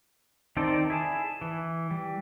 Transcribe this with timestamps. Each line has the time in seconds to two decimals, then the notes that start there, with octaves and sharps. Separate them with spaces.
0.57 D#3 C4 D#4 A4 D5
0.90 E4 G#4 A5
1.41 E3
1.91 G3